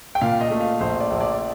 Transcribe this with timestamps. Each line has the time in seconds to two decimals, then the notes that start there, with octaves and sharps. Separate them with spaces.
0.15 G5
0.21 A#2 F5
0.41 D#5
0.51 A3
0.61 F5
0.80 A#1 C5
1.00 D5
1.11 A#1
1.20 D5